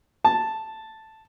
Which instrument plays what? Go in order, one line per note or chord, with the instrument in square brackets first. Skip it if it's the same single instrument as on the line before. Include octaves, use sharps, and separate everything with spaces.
[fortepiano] A5